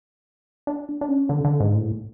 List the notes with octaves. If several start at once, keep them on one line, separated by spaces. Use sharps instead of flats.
D4
D4
C#4
D3
D3
G#2
A2